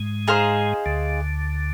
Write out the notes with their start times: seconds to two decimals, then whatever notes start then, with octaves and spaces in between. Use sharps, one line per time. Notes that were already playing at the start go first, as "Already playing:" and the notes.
Already playing: G#2 G#3
0.28 D#4 G#4 C5 F5
0.86 D2 D3